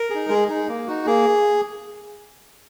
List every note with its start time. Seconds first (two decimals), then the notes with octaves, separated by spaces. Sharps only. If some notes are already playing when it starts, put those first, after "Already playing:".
Already playing: A#4
0.10 D#4 G#4
0.29 G#3 G#4
0.48 D#4 G#4
0.68 A#3
0.87 D#4 F#4
1.06 A#3 G#4